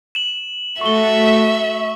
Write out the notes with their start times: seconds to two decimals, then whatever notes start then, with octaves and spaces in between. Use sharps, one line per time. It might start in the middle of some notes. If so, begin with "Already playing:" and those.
0.15 E7 F#7
0.81 A3 F#4 A4 E5 C#6 G7